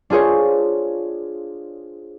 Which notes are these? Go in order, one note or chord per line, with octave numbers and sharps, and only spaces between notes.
D4 F4 G#4 C5 C#5